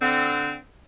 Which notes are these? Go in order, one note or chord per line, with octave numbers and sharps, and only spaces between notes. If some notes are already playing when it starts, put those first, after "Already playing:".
D3 C4